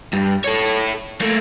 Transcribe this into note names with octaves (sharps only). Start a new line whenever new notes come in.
G2
A4 C#5
A3 A#3